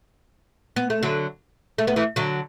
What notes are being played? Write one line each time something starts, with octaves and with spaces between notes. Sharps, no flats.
B3
A3
D3 F#3
A3
B3
E3 A3
D3 F#3